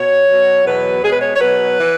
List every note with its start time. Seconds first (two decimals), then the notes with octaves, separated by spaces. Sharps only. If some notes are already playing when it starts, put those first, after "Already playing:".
Already playing: B2 C#5
0.28 B2 F#3
0.65 E2 B2 F#3 B4
1.03 B2 G#3 G#4
1.12 B4
1.22 C#5
1.36 C#5
1.40 B2 F#3 B4
1.79 E3